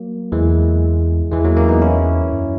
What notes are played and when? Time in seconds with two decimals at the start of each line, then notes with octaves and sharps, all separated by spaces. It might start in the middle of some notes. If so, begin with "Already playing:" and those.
Already playing: F#3 A#3
0.32 E2 E3 G#3
1.32 E2 E3 G#3
1.45 F#3 A#3
1.56 A#3 C#4
1.69 B3 D#4
1.82 C#4 E4
2.32 F#2